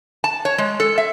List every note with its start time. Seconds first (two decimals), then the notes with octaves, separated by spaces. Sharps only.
0.24 A5
0.45 C#5
0.58 G#3
0.80 A4
0.98 E5